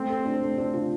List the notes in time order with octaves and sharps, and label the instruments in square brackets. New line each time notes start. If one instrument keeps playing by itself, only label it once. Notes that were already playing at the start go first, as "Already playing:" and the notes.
Already playing: [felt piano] A3 [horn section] C4
[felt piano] A4
D4
A3
D4
F4